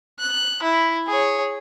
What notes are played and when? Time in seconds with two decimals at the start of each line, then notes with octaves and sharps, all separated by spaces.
0.20 F#6
0.63 E4
1.07 G#4 C#5